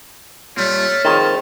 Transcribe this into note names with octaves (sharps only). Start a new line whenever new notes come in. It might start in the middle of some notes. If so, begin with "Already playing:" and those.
A#2 G3 A3 C#5 F6
F2 D#3 G#4 A#4 C5 A5